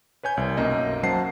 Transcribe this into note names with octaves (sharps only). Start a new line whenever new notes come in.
B4 C#5 G#5 G6
C2
B1 F#2 A#3 D#5
F#2 F#3 C5 F#5 A5 C7